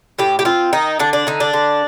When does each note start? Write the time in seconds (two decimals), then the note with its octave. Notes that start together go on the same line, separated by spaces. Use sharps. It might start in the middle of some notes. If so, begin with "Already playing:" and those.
0.19 A2 G4
0.39 G4
0.45 C4 F4
0.73 D#3 D#4
0.99 D3 D4
1.13 D4
1.27 D3 D#4
1.40 D4
1.53 D3